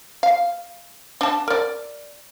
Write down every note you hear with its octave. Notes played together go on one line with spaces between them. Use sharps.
F5
D4 A5
A#4 D5